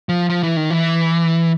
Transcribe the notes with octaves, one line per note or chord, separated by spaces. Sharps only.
F3
F3
E3
D#3
E3